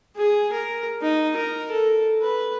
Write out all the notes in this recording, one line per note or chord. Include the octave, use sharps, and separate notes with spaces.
G#4
A#4
D#4
A#4
A4
B4